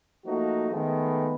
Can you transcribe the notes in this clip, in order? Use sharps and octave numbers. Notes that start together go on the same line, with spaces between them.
F3 A3 A#3 D#4 F#4
D#3 G#3 A3 B3